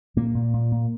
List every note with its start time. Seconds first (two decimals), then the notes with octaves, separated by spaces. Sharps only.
0.16 A#2 A#3
0.35 A#2
0.54 A#2
0.72 A#2